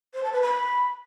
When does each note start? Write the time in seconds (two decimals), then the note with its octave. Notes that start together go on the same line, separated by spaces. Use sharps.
0.14 C5
0.23 A5
0.33 B4
0.42 B5